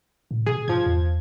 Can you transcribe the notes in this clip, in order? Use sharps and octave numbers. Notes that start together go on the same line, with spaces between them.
A2
B2 G#4
G2 F3 G#6
E2